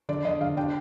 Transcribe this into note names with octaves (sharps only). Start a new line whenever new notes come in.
D3 D5
D3 D#5
D3 F5
D4 G5